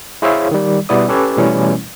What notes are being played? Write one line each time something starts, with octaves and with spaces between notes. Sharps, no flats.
E4 G#4 C5 C#5 E5 F5
D#3 G3
B2 G3 B3 E4 D5 D#6
C#4 G4 A4 B4 C#5
B2 E3 G3 A3 C#4 E4